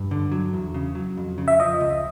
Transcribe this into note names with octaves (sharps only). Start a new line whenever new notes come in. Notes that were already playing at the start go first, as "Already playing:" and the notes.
Already playing: G2
D3
F#3
E2
C#3
F#3
F2
C#3
E5
F3 D#5
C#2